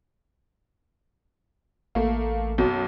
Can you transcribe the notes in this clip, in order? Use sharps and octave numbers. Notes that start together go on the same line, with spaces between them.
A1 A3 A#3
B1 F#2